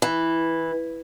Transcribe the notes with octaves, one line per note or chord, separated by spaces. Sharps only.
E3